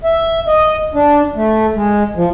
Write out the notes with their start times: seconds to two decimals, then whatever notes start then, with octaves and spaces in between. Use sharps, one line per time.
0.04 E5
0.48 D#5
0.94 D4
1.35 A3
1.75 G#3
2.16 F3